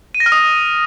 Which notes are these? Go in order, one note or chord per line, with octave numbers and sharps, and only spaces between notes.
D#7
A#6
F6
D#6